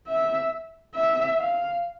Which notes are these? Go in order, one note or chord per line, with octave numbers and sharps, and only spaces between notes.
E5
E5
F5